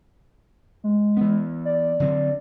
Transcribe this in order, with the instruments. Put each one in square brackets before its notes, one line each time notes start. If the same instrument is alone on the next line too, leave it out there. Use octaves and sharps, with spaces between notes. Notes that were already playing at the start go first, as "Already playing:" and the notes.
[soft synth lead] G#3
[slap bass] E3 B3
[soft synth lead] D5
[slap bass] D3 F#3 C4